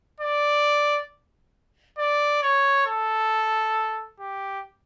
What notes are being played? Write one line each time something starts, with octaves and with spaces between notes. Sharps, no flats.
D5
D5
C#5
A4
G4